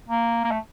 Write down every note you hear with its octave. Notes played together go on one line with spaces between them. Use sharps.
A#3
A#3
A3